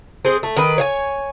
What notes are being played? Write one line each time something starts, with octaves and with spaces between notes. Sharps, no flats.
G#3 C4 G#4
A3
D#3 B4
C#5 F5 G#5